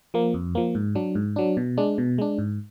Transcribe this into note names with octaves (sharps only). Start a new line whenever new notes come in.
F3 A#3
F2
F3 A#3
G#2
F#3 D4
G#2
F#3 D4
B2
G#3 D4
B2
G#3 D4
G#2